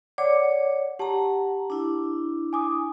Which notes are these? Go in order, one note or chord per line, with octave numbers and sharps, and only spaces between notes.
C#5 D5 F#5 D6
G4 F#5 A5 A#5
D4 E4
G#5 D6 D#6